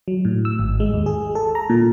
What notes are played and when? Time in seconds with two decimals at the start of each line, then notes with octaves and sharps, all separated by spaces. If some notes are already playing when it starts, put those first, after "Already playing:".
0.08 F#3
0.25 A2
0.45 E6
0.59 G#1
0.80 G#3
0.93 D#2
1.06 G#4
1.35 A4
1.55 A#5
1.70 A#2